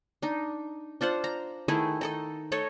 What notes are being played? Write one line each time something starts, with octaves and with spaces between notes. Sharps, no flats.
D4 D#4
D4 F4 C5 F#5
A#5
D#3 A3 E4 G#4
D#4 A4 D#5
A3 A4 C#5 D#5